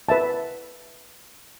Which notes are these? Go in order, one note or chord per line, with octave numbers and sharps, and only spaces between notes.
B4 E5 A5